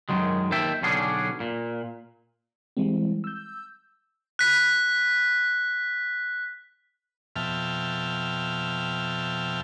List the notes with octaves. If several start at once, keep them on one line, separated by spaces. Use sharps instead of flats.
F#2 D#3 F#3 G#3
D#2 D#3 E5 G5 A5
B1 D3 G3 C#4 D4 G#4
A#2
E3 G3 G#3 C4
E6 G6
F#6 B6
F2 B2 E5 G5 A5 F6